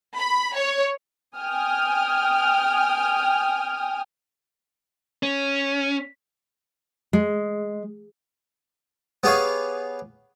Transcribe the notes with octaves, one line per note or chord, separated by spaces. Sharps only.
B5
C#5
G5 G#5 D#6 F6
C#4
G#3
B3 G4 G#4 C#5 F5